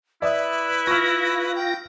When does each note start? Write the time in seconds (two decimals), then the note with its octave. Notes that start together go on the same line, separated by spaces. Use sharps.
0.22 E4 B4 D5 E5 D#6
0.87 F4 C#6 F6 A#6
1.55 G5